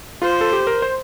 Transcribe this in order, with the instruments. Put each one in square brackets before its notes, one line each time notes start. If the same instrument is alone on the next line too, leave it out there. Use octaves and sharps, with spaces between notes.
[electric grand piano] F4 [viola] C5
[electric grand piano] A4
G4
A#4
C5